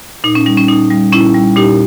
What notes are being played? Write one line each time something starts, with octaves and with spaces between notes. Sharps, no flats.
A#2 D#4
C#4
G3 D#4
C#4
A#2 D#4
G3
A#2 C#4 E4
G3
A#2 D#4 G4